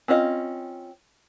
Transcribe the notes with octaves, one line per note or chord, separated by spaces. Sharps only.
C4 C#4 F4 D#5